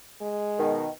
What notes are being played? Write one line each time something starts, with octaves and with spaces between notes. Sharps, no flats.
G#3
B2 D#3